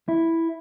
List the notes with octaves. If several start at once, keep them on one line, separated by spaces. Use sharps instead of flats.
E4